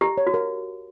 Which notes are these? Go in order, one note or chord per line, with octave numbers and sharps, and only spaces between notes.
G4 A#5
C#5
F#4
A#4